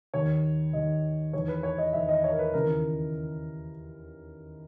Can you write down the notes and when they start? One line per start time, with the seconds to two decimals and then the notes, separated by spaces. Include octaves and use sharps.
0.13 D#2 D#3 C#5
0.73 D#2 D#3 D#5
1.33 E2 D#3 C#5
1.48 B4
1.63 C#5
1.78 D#5
1.93 E2 D#3 E5
2.08 D#5
2.24 C#5
2.32 A#4
2.39 B4
2.53 D#2 C#3 E3 A#4